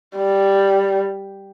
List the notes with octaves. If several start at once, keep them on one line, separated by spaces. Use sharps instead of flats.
G3